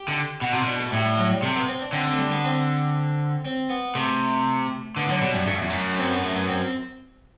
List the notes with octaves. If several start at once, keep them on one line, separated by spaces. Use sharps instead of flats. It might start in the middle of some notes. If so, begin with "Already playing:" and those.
Already playing: G4
D3
B2 F#4
C3 E4
B2 D4
A3
A2 G3
G3
F#3
G3
C3 A3
B3
C4
D4
D3 C4
C4
A3
G3
B3
C4
C4
B3
C3 A3
D3 B3
D3 F#3
B2 G3
F#2 G3
G2 A3
F#2
E2
F#2
C4
B3
A3
B3
C4
C4